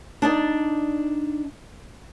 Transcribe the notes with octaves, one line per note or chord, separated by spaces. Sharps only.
D4 D#4 D5